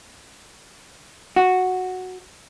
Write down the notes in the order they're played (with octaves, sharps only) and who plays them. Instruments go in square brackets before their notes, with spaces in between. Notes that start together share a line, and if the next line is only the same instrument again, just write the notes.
[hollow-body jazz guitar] F#4